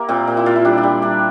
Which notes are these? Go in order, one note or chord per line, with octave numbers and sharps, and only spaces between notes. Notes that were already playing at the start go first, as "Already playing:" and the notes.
Already playing: A#3 E4 G4
A#2 C4
A#2
E4
A#2 F4
E4
G3 D4
D4
G3
G3 D4